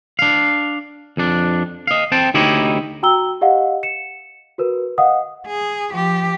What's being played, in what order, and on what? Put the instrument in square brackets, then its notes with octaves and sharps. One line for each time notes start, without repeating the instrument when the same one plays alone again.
[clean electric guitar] D4 F5
F2 D4
D#5 F5
C4 G5 A5
D2 D#4 E4 G4 C#5 D#5
[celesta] F#4 G5 A#5 E6 G7
G4 D#5 F5 F#5
C#7 E7
F#4 A#4 B4
D#5 F5 F#5 D#6
[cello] G#4
F3 G4